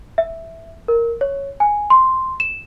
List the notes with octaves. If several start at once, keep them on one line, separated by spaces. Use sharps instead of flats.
E5
A#4
C#5
G#5
C6
E7